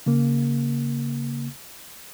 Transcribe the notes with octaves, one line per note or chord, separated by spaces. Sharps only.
C#3 A#3